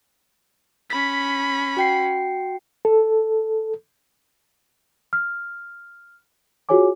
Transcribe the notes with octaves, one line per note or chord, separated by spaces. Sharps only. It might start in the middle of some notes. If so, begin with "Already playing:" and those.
C#4 B5 B6
F#4 G5 C7
A4
F6
F4 F#4 G#4 C#5 G#5 D6